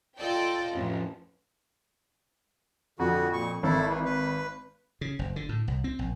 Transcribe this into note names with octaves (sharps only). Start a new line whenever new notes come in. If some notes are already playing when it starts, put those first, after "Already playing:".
F4 A4 D5 D#5 G5
A1 F2 A2
F2 D3 F#4
A#2 C#6
G#1 E4 A4
E3
B4
C#3
F#1
D3
A2
C2
C4
A#1